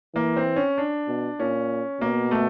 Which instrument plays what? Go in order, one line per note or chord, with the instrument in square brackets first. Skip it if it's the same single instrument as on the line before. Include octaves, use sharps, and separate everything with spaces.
[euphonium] E3 [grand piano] A#3
[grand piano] C4
C#4
D4
[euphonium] B2
[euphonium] A#2 [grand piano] C#4
[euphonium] B2 [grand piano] A#3
[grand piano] A3